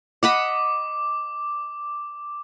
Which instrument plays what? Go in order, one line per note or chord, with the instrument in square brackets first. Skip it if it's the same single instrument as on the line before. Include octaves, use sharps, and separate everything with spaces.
[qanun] D#5 F#5 B5 [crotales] D6